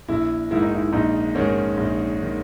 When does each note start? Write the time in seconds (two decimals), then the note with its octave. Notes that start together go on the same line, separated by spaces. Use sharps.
0.08 A#1 E4
0.51 G#2 D#3 E4
0.62 D#4
0.75 E4
0.92 A#1 D#4
1.35 G#2 D#3 C#4
1.77 A#1
2.23 D#3